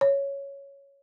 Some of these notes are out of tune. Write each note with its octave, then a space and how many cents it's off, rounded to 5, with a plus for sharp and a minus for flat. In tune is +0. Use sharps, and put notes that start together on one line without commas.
C#5 +0